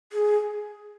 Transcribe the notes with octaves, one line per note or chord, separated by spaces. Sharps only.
G#4